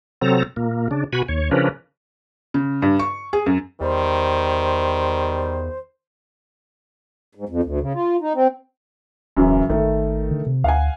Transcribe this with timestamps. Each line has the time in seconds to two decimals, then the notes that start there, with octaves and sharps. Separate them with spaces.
0.22 C3 F#3 C4 A4 A#5
0.56 A#2 A#3
0.91 C#3 D4
1.13 B2 F#4 G#5 B5
1.28 D#2 C#5
1.51 C#3 F3 C#4 D4 A#4 B4
2.54 C#3
2.82 G2
2.99 C#6
3.33 G#4
3.46 F#2
3.81 E2 D#3 G3 C5
7.35 G#2
7.49 F2
7.63 D2
7.80 C#3
7.94 F4
8.21 D#4
8.34 C4
9.37 D#1 F#2 C#3 E3
9.69 G#1 D#3 A3
10.31 D3
10.47 C3
10.64 D2 F5 F#5 G#5